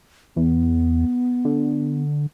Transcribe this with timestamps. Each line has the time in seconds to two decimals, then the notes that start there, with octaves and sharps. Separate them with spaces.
0.36 E2 B3
1.45 D3